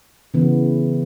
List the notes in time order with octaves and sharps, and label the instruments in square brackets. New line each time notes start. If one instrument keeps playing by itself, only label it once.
[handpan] C#3 E3 B3